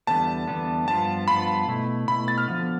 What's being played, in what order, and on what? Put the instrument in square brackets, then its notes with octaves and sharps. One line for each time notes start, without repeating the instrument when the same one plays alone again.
[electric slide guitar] E2 D3 G3 B3 [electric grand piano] A5
[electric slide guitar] E2 D3 G3 B3
[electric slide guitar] G2 F3 B3 F4 [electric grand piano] A5
[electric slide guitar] G2 F3 B3 F4 [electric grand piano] B5
[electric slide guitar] B2 A3 E4
[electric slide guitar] B2 A3 E4 [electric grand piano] B5
[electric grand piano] A6
F6
[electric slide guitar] D3 F3 B3